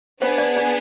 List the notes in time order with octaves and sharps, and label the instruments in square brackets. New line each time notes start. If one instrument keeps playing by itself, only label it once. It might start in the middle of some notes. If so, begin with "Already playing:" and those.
[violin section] B3 D4 G#4 [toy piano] C5
[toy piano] D5
D5